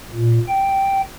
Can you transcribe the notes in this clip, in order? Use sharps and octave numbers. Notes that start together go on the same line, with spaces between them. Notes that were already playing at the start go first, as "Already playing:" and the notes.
A#2
G5